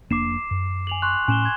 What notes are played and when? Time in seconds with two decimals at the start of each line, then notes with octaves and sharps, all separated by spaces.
0.11 F1 A#3 D4 D6 C7 E7
0.51 F#2
0.87 G#5 F7 F#7
1.02 C6 C#6 F#6
1.28 A2 C#4 G#5 E7 G7
1.42 C6 G#6